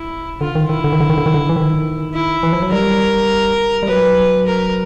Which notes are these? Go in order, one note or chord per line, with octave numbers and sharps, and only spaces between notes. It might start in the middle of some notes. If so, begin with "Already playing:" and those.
Already playing: E4
D3 F4
D#3
D#3 E4
D3
D#3
D3
D#3
D3
D#3
D3
E3
D#3
E4
E3
F3
F#3
G3 A#4
G3
F#3 B4
A#4